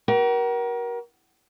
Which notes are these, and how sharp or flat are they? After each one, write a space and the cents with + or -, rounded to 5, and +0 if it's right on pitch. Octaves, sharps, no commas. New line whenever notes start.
F#4 +45 A#4 +30